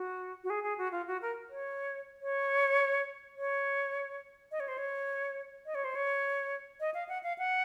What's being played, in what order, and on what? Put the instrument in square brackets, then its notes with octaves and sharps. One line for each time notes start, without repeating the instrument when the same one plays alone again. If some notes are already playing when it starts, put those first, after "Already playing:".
Already playing: [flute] F#4
F#4
G#4
G#4
F#4
F4
F#4
A#4
C#5
C#5
C#5
D#5
C#5
C5
C#5
D#5
C#5
C5
C#5
D#5
F5
F#5
F5
F#5